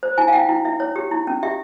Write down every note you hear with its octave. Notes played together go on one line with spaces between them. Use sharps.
C5
E4 G#5
F5
E4 G5
E4
E4 E5
E4 C#5
G4
E4
C#4
G4 E5